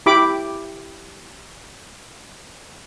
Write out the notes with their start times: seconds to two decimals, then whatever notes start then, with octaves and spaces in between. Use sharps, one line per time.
0.06 E4 G4 B5 D6